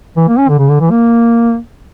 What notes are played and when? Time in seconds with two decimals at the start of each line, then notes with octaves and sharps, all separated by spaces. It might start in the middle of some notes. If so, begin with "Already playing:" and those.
0.17 E3
0.28 A#3
0.38 C#4
0.49 D3
0.59 C#3
0.69 D3
0.80 E3
0.91 A#3